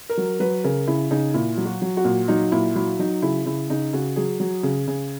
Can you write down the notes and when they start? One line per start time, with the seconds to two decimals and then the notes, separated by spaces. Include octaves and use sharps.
0.09 A#4
0.17 F#3
0.40 F#3 B4
0.64 C#3 A#4
0.87 C#3 E4
1.11 C#3 D#4
1.34 A#2 E4
1.57 F#3
1.66 F#4
1.82 F#3
1.97 F#4
2.04 A#2
2.28 F#3 D#4
2.52 A#2 E4
2.75 F#3 E4
2.99 F#3 D#4
3.22 C#3 E4
3.46 C#3 E4
3.70 C#3 D#4
3.93 C#3 F#4
4.16 F#3 G#4
4.40 F#3
4.63 C#3
4.88 C#3